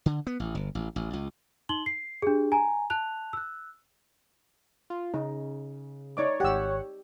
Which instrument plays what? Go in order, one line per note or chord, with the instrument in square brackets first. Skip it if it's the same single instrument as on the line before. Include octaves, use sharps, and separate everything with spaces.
[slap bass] D3
B3
A1
G1
A1
A1
C#2
[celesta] D#4 C6 F#7 G7
C7
D4 G4 G#4
G#5 A#5
A5 F#6 F7
E6 F#6
[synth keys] F4
[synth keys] C#3 [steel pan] D#4
[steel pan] D#4 D5 D6 [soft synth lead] C#5
[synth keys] G#1 F#5 [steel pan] G4 E6